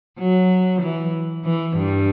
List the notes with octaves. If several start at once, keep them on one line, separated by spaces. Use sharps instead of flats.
F#3
E3
E3
G2